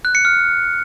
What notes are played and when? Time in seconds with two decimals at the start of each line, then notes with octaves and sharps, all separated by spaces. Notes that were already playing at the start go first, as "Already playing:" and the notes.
0.05 F#6
0.15 C#7
0.25 F6